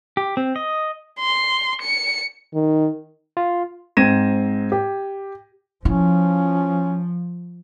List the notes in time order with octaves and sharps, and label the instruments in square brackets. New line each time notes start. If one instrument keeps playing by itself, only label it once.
[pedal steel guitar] G4
C4
D#5
[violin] C6
C#7
[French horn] D#3
[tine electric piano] F4
[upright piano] G#2 C4 G#6 A#6 D#7 E7
G4
[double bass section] F3 [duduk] C#4 [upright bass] E4